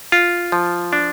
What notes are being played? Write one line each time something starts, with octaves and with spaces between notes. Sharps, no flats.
F4
F3
D4